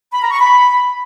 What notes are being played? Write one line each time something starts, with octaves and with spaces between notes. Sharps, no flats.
B5
A#5
C#6
B5